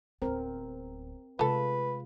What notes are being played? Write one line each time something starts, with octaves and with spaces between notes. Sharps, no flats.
D1 B3 C4 A#4
C3 G#3 A3 F4 A4 B4